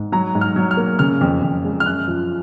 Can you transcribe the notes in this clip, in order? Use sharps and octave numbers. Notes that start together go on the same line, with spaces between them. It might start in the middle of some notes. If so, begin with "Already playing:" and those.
Already playing: G#2
F#3 A#5
G#2
F6
F#3
F6
A#3
C#3 F6
F2
F2
G#3
F6
F#2 F#6
F3